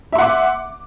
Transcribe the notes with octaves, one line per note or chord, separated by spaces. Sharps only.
E5 F#5 C6 D6